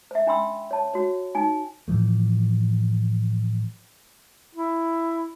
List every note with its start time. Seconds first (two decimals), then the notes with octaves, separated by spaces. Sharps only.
0.11 C5 E5
0.26 C#4 D4 G5 B5 C6 E6
0.71 C#5 A5
0.94 F#4 C#5
1.35 D#4 G#5
1.88 A2 E3 F3 A3
4.55 E4